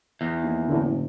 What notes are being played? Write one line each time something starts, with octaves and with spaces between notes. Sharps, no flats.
E2
D#2
F#1 A2 D3